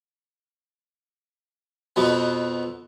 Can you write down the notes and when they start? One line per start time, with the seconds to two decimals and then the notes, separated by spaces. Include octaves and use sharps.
1.96 F2 B2 B3